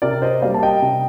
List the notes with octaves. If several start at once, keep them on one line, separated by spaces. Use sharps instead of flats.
C3 A#4 D5
C5 D#5
G3 A#3 D5 F5
A5
D#5 G5
C3